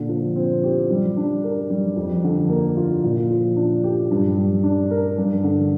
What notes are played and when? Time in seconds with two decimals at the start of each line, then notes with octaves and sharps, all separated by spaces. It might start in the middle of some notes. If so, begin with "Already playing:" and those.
Already playing: A#2 D3
0.09 F3
0.36 C4
0.64 G4
0.90 G3
1.17 D4
1.44 A#4
1.70 G3
1.96 F2
2.24 D3
2.50 A#3
2.77 F4
3.04 A#2
3.30 F3
3.56 D4
3.84 G4
4.11 G2
4.37 G3
4.64 D4
4.91 A#4
5.18 G2
5.44 D3